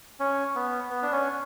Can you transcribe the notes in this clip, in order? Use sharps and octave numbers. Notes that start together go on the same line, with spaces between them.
C#4
B3
B3
D4
C#4